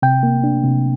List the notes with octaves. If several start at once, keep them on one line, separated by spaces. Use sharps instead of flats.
C3 G5
A#3
D4
C3